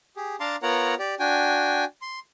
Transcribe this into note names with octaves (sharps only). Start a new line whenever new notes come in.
G4 G#4
D4 F5 A5 A#5 C6 D6
B3 F4 A#4 C#5 F#5 A#5
G4 D5
D4 F#4 G5 G#5
C6